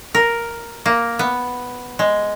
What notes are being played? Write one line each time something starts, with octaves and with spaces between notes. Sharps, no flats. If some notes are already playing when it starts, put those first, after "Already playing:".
A#4
A#3
B3
G#3